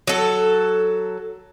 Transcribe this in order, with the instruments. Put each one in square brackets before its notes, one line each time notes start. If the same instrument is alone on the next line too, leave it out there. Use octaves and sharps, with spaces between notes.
[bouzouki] F#3 A4